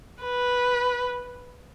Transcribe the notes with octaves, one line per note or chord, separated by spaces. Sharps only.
B4